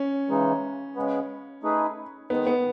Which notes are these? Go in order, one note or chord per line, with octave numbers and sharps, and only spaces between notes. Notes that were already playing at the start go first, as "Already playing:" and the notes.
Already playing: C#4
C#3 E3 G#3 D#4
C#3 G#3 B3
A3 D#4 G#4 B4
D#3 G#3 B3 D#4
B3